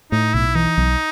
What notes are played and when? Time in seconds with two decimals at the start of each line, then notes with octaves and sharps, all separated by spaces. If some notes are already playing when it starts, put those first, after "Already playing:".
0.11 A2 D#4
0.34 B1 E4
0.55 E3 D#4
0.77 B1